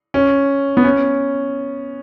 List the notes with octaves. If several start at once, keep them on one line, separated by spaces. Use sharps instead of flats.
C#4
B3
C#4